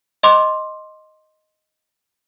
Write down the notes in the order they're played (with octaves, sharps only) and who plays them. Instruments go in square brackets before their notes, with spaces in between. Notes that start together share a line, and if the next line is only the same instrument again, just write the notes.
[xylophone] D#5 C6 D6